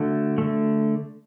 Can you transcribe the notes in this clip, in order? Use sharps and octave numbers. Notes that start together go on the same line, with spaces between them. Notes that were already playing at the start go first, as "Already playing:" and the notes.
Already playing: D3 A3 F#4
D3 A3